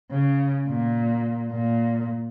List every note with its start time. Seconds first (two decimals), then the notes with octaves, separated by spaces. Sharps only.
0.12 C#3
0.70 A#2
1.51 A#2